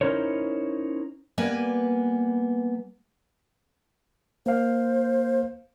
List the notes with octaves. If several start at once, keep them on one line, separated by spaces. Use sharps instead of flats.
C#4 D#4 E4 A#4 C5 C#5
G3 A#3 B3 B4 G#5
A#3 C5 F5